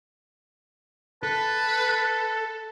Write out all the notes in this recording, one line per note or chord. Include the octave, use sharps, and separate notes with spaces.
A4 B4 A5